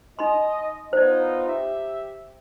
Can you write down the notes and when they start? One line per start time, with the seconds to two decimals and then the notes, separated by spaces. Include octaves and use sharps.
0.19 D#4 D#5 B5 C6
0.93 B3 D#4 F4 C5 D5
1.47 G4 E5